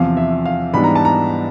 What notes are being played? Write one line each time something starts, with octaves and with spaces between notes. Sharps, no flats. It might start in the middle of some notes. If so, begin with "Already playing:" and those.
Already playing: E2 C3 F3 F5
E5
F5
G#2 E3 G3 B3 D4 B5
A#5
A5
A#5